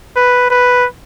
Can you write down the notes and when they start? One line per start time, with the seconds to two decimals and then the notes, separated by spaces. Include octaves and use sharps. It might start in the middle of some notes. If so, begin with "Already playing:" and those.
0.16 B4
0.50 B4